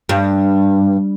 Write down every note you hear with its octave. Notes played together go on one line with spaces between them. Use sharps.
G2